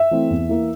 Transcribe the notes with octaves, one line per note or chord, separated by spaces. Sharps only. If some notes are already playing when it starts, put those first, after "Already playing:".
Already playing: E5
E3 A3 C4
E2
E3 A#3